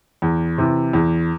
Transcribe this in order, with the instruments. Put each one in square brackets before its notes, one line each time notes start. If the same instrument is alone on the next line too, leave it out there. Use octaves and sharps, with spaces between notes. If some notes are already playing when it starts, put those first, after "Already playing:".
[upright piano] E2
C3 E3
E2